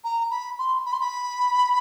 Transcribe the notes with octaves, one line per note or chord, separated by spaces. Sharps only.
A#5
B5
C6
B5
C6
B5